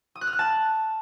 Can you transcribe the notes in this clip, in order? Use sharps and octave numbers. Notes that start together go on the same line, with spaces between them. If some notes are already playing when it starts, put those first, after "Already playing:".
D#6
F#6
F6
F#6
A5